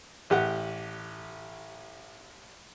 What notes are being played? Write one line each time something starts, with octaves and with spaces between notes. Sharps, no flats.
A1 G4 F#5